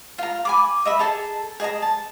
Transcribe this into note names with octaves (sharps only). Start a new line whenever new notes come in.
F4 A#5
G#5 B5 D6
D#5 E5 B5
G#4 A4 A5 A#5
G#4 D#5 A5 A#5
A5